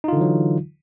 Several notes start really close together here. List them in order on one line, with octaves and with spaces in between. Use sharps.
D#4 F4 D3 E3 F#3